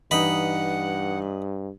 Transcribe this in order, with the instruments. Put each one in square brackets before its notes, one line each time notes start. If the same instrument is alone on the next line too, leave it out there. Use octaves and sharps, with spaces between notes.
[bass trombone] G2 [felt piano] E3 D#4 [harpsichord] D#5 B5 [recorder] F#5